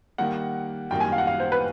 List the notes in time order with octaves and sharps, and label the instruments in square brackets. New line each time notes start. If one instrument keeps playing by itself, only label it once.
[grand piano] D#3 G3 A#3 [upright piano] F#5
[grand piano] F#2 D#3 G3 A#3 [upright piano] G5
[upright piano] G#5
F5
F#5
F5
C5
B4